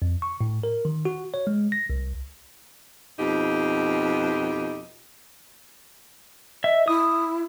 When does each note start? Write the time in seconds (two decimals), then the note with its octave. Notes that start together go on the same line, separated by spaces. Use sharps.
0.02 F2
0.22 C#6
0.41 A2
0.63 A#4
0.85 D#3
1.05 F#4
1.34 C#5
1.47 G#3
1.72 A#6
1.90 C2
3.19 F2 B2 D#4 G4
6.64 D#5 E5
6.88 E4 D#6